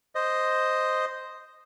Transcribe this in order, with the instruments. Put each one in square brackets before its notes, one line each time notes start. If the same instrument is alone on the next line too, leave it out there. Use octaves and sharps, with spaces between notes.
[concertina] C5 D#5